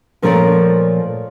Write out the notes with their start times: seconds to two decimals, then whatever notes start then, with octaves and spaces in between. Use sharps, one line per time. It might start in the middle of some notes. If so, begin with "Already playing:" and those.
0.22 A#2 F3 A3 A#4 C#5 D5